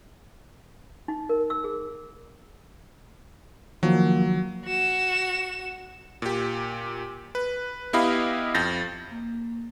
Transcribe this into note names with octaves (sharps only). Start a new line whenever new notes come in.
D#4
A#4
E6
G#4
D#3 F3 F#3 A#3
F#4 E7
A#2 G4
B4
B3 E4 G4 D#5 F5 B5
F2 G6 A6 A#6
A#3